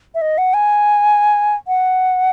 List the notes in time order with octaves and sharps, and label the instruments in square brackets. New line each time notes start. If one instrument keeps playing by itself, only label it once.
[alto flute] E5
D#5
F#5
G#5
F#5